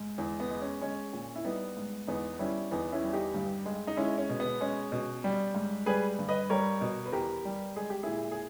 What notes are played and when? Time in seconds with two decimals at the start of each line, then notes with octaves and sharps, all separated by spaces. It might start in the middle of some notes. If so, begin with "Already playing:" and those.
Already playing: G#2
0.18 E2
0.40 B3
0.50 G#3
0.61 C#4
0.81 G#3 C#4
1.13 A#2
1.36 E4
1.45 G3 B3 D#4
1.77 G#2
2.07 E2 B3 D#4
2.39 G3 C#4 E4
2.71 E2 B3 D#4
2.92 C#4 E4
3.03 G3
3.13 D#4 G4
3.34 G2
3.66 G#3
3.87 D#4
3.97 G#3 C#4 E4
4.18 C#4
4.30 B2
4.40 B3
4.61 G#3 C#4
4.92 B2
5.24 G3
5.55 G#2
5.86 G3 G#4 B4
6.19 G2
6.29 B4 D#5
6.50 G3 A#4 C#5
6.81 B2
7.06 B4
7.12 E2 G4 A#4
7.45 G3
7.76 G#3 G#4
7.90 G4
8.03 A#2 E4 G#4
8.32 G#4